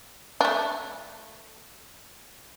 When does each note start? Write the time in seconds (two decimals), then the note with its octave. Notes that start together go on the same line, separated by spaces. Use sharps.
0.41 A3 D4